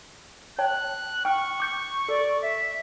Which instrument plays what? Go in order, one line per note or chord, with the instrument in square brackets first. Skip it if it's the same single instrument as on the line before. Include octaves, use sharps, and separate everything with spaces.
[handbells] C#5 G5 A5 [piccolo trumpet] F#6
[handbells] G5 F6 [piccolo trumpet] C#6
[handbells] D6 G6 C#7
[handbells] A4 [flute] D5
[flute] E5